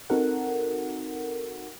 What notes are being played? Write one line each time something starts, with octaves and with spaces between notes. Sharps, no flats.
C4 D#4 F#4 A4 A#4 F#5